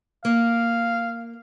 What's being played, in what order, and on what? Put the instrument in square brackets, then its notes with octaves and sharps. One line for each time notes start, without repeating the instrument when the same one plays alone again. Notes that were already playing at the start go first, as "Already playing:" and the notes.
[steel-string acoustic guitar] A#3 [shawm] F5